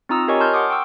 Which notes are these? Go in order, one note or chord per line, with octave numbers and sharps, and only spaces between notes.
C4 D#4 F4 A#5 D#6 E6
G4 A#4 C#5 D#5 G#5 C#6
A5 C6 F6 G6
F#5 C6 D6 D#6
G5 C#6 E6